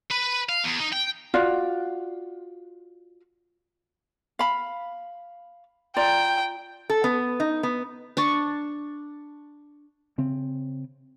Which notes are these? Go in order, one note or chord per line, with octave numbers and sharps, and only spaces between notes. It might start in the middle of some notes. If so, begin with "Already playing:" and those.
B4
F5
E2
D#4
G5
F4 F#4 D5 F5
F5 B5
F4 D5 G5 A#5
A4
B3
D#4
B3
D4 A5 C#6
C#3 C4